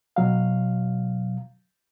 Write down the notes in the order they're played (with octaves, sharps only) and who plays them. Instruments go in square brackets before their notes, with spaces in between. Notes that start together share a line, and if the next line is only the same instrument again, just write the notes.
[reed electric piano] B2 F#3 F5